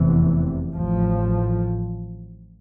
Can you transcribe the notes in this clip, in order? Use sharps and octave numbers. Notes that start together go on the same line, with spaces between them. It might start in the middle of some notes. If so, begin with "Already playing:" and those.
Already playing: F1 E2 C3 E3
A1 A2 F3